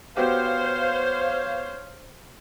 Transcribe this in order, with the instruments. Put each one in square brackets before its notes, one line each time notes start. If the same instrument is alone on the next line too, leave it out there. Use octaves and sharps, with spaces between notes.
[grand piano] B3 F#4 G4 [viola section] C5 [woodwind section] C#5 F5